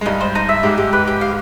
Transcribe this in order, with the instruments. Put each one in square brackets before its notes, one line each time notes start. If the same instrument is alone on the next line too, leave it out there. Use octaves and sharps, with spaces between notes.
[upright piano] G#3
[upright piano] G2 G3 [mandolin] D#4
[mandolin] C5
D#4
E5
[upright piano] G#2 G#3 [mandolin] G4
[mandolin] G4
B4
G4
F5